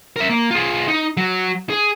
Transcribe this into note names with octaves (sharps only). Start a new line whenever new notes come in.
A#4 E5
A#3
F4 G#4
D#4
F#3
G#4